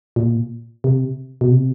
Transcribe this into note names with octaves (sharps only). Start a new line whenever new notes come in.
A#2
C3
B2
C3